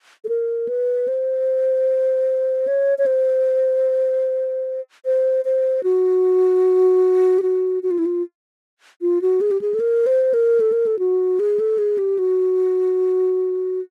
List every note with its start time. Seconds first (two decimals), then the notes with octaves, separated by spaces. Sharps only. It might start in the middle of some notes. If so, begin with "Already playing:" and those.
0.24 A4
0.29 A#4
0.68 B4
1.08 C5
2.67 C#5
2.98 C#5
3.06 C5
5.05 C5
5.45 C5
5.83 F#4
7.38 G4
7.42 F#4
7.83 F#4
7.91 F4
7.99 E4
8.06 F4
9.02 F4
9.22 F#4
9.41 G#4
9.51 G4
9.61 G#4
9.74 A4
9.80 A#4
10.06 C5
10.34 A#4
10.60 A4
10.72 A#4
10.87 A4
10.99 F#4
11.40 G#4
11.60 A4
11.78 G#4
11.98 G4
12.19 F#4